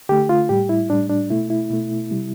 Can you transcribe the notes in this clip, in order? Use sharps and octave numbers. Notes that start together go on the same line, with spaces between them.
D3 A3 G4
F4
A2 G3 G4
E4
A2 G3 D4
D4
B2 A3 E4
E4
B2 A3
C3 G3